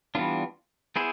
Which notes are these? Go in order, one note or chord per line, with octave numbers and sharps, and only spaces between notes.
E3 G3 B3 D4 F4
B3 E4 G#4 C5